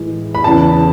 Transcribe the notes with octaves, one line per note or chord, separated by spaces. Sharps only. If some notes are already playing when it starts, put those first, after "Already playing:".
Already playing: A2 E3 G#3
B5
E2 C#3 E3 A5